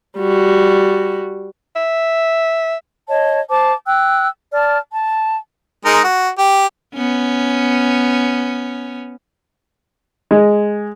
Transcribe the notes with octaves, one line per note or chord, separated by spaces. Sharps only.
G3 F#4
E5
C#5 D#5 A5
C5 A5 D6
G5 E6 F#6
D5 A5 F6
A5
G#3 D#4 A#4
F#4
G4
B3 C#4
G#3